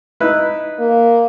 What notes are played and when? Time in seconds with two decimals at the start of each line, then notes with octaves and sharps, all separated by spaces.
0.20 D#4 E4 B4
0.79 A#3